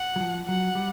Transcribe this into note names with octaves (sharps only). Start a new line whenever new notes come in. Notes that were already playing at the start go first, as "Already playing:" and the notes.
Already playing: F#5
F#3
F3
F#3 F#5
G3